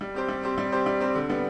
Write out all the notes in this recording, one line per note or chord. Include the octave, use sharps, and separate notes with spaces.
G3
C4 G4 C5
G3
C4 G4 C5
G3
C4 G4 C5
G3
C4 G4 C5
D3
G3 B3